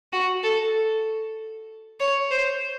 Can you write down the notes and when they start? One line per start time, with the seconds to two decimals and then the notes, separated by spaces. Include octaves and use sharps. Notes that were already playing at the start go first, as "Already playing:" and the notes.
0.13 F#4
0.43 A4
2.00 C#5
2.31 C5